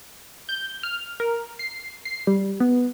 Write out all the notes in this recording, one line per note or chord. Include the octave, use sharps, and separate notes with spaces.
G6
F6
A#4
C7
C7
G3
B3